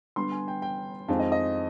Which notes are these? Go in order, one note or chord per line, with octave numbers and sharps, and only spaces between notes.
D3 G3 B3 C6
G#5
G5
G5
F2 D#3 G#3 C4 F5
D#5
D#5